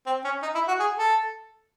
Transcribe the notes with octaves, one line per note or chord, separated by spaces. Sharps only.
C4
C#4
D#4
E4
F#4
G#4
A4